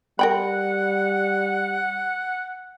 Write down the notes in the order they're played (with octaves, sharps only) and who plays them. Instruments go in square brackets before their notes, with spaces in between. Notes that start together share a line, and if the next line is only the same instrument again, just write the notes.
[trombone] G3 [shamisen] A#4 G5 B5 [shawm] F#5